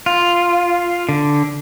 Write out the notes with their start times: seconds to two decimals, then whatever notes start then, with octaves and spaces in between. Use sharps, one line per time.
0.06 F4
1.09 D3